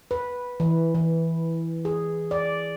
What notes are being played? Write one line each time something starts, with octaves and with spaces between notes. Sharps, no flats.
B4
E3
E3
G#4
D5